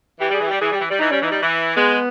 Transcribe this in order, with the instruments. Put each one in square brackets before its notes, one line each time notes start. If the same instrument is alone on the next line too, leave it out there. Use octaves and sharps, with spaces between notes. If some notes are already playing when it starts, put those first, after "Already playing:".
[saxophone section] E3 [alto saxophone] G4
[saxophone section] G3 [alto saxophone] G#4
[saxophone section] E3
[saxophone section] G3 [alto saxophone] G4
[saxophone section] E3 [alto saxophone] G#4
[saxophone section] G3 [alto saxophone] G4
[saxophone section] E3
G3
[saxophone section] E3 [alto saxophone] D#4
[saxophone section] G3 [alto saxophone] C#4
[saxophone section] E3 [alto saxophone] D#4
[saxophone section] G3
E3
[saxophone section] G#3 [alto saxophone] B3